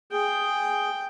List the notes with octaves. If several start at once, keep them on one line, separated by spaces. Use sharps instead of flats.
G#4 G5